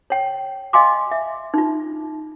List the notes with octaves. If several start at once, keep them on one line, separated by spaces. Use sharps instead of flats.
C#5 G5
D#5 F5 G#5 C6 D6
E5
D#4 F4